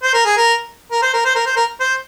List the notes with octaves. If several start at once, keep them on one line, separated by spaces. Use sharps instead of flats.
C5
A#4
G#4
A#4
A#4
C5
A#4
C5
A#4
C5
A#4
C5